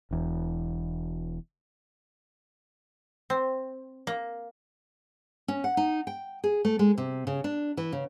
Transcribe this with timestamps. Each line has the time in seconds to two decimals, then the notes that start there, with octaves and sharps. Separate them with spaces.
0.11 E1 E2
3.30 C4
4.07 A#3
5.48 C#4
5.64 F#5
5.77 D#4
6.07 G5
6.44 G#4
6.65 A3
6.79 G#3
6.98 C3
7.27 C#3
7.44 D4
7.77 E3
7.92 C#3